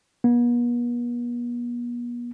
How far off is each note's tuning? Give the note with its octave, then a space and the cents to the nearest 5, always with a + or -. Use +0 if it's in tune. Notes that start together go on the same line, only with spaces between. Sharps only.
B3 -45